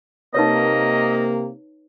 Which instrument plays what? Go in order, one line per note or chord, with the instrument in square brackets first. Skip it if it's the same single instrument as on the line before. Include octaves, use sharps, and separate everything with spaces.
[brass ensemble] C3 A#3 [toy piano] D#4 B4 C#5 [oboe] D#5